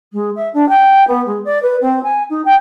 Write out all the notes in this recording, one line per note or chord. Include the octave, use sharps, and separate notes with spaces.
G#3
E5
D4
G5
B3
G#3
D5
B4
C4
G#5
D#4
G5